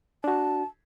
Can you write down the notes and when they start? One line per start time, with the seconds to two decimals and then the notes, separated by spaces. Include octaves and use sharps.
0.24 D4 F#4 A5